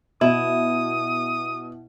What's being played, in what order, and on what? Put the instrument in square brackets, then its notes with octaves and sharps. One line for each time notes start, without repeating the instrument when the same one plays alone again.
[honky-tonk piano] B2 [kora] E4 [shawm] D#6